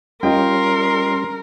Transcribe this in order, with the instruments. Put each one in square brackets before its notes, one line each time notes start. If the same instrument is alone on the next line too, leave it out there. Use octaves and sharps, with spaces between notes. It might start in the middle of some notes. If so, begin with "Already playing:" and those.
[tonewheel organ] G3 C#4 [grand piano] F4 D#5 G5 [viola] A#4 [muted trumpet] C6